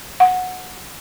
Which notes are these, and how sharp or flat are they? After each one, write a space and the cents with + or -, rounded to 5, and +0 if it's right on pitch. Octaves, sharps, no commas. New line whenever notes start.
F#5 -15